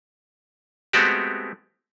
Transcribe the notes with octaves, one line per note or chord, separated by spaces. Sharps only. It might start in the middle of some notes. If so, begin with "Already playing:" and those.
G#3 A3 B3 C4 F#4 G4